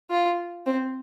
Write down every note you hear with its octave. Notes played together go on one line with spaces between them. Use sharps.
F4
C4